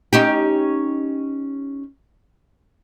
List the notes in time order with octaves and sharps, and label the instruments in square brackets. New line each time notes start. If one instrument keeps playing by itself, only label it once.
[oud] C#4 D#4 G4